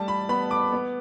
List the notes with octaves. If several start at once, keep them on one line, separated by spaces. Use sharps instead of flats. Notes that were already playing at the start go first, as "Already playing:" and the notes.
Already playing: G3 A3 A5
B5
B3 B5
D6
B3